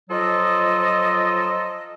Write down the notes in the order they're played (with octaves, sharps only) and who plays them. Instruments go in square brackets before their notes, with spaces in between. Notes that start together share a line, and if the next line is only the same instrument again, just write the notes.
[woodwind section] F3 F#3 F4 A4 D#5